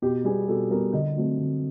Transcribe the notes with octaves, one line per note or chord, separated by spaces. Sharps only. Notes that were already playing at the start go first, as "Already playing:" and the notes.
B2 G4
G3 B3 G#4
B2 A4
G3 B3 A#4
D3 D#5
F#3 A3 C4
D3